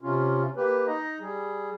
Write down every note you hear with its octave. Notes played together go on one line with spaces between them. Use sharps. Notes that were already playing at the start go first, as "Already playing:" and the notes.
C3 C#4 F4
A#3 G4 B4
D#4 D#5 A#5
G3 G#4